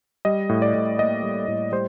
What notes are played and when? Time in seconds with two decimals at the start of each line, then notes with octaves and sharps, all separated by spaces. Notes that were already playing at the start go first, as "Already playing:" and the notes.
0.25 G3 D#5
0.49 A2
0.62 D5
0.74 A2
0.99 A#3 D#5
1.23 G3
1.48 A2
1.72 G3 C5